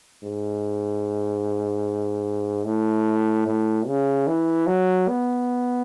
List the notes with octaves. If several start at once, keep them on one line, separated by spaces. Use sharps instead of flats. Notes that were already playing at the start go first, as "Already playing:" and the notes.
G#2
A2
A2
C#3
E3
F#3
B3